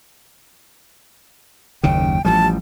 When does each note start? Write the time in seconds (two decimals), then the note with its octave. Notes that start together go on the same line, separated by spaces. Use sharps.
1.83 F#1 D#2 C#3 G5
2.25 A1 F3 G3 A5